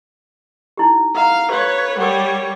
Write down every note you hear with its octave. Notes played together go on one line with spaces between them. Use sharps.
D#4 E4 G4
F5 F#5 A#5
G4 B4 C#5 F5
G3 A#4 C#5 F#5